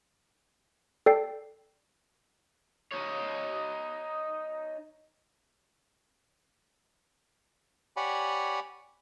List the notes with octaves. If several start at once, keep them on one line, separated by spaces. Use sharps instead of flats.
A4 D5 G5 C7
D#4 C#5
G4 C#5 D5 F#5 G#5 B5